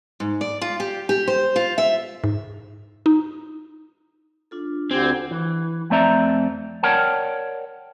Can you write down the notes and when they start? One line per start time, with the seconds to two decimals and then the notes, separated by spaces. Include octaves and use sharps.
0.20 G#2
0.41 D5
0.61 F4
0.80 G4
1.09 G4
1.28 C5
1.56 F4
1.78 E5
2.24 G#2
3.06 D#4
4.51 D4 F4 A4
4.91 D2 D3 C4 G4 G#5
5.31 E3
5.90 F2 A3 C4 D5 E5 A#5
6.83 A#4 C#5 D5 F#5 G5 A5